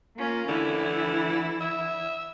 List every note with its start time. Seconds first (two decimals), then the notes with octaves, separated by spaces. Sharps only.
0.17 A#3 C#4 F4
0.48 D3 E3 E4
1.60 E5